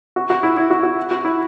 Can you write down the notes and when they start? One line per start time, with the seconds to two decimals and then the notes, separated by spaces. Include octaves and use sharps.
0.16 F#4
0.30 F#4
0.43 E4
0.57 E4
0.70 F#4
0.83 F#4
1.11 F#4
1.25 E4